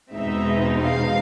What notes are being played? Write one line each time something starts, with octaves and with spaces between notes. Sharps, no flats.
E2 B2 G#3 C4 D#4 E5
F5